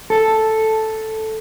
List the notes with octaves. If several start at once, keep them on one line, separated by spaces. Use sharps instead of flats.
A4